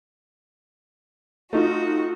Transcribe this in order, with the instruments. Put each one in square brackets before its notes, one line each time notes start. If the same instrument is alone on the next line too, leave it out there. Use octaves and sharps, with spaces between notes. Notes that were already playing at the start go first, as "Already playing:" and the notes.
[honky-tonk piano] A3 D#4 F4 [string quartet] F#4